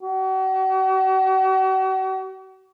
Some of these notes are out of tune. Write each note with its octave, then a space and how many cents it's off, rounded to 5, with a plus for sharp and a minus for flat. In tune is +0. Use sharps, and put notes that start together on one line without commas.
F#4 +40